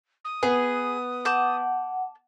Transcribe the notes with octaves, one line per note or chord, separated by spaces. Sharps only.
D#6
B3 G#4
F#5 A5 D6 G6